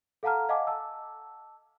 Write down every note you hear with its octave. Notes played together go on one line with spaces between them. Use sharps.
A4 F5 F#5 A5 A#5 F6
D#5 F5 F#5 G#5 A5 D6
A5 E6